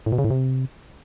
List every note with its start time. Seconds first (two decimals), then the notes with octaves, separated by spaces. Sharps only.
0.06 A2
0.12 B2
0.18 C#3
0.25 A2
0.31 C3